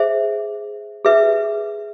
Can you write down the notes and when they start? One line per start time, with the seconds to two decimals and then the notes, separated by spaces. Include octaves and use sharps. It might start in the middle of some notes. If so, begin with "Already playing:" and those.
Already playing: G#4 C5 E5
1.05 G#4 B4 E5